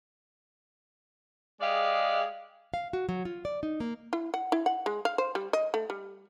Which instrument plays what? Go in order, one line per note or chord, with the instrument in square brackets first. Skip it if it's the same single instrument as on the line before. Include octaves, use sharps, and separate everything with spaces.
[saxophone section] G#3 G4 G#4 D5 D#5 F5
[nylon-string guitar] F5
F#4
F#3
F4
D5
D#4
A#3
[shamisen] E4
F#5
E4
F#5
G#3
F5
C5
G3
D#5
A3
G3